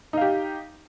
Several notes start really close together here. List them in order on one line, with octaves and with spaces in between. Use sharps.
D#4 F5 G4